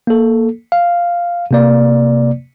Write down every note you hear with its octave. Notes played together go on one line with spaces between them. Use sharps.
A#3 A4
F5
C3 A#3 D5